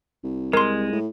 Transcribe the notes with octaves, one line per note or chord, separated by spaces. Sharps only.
C2
G#3 A#4 C6
A2